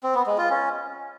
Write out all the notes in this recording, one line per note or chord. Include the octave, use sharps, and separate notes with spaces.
C4
B3
G#3
F4
C#4